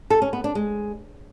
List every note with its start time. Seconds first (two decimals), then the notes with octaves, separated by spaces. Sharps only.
0.10 A4
0.22 C#4
0.33 B3
0.44 D4
0.55 G#3